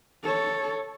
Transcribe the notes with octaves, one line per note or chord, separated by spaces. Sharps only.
A4 C#5